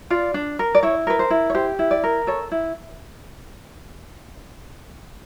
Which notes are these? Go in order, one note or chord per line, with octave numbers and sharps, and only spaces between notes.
F4 D5
D4
A#4
D5
E4 C#5
A#4 B4
C5
E4
C#5
G4 C5
E4
D5
A#4
A4 C#5
E4